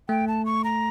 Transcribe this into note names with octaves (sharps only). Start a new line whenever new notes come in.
A3 G5
A5
C#6
A#5